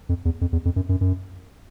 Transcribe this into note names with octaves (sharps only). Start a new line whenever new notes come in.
F2
E2
F2
E2
F2
F#2
F#2
F#2